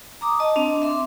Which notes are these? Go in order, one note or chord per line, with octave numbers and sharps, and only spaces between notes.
A#5 D6 D#6
D#5 A5
C4 D4
E5 C6 D6